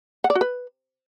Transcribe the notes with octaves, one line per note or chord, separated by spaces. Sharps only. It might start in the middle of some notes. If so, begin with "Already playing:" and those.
F#5
D5
F#4
B4